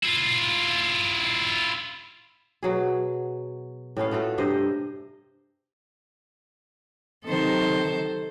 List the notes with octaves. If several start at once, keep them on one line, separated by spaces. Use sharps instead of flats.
E4 F4
B2 F#3 G#4
A2 B3 C#4 F5
A3 F4 F#4 A4
G2 C3 C5 D#5
C3 D#3 F#3 A4 C5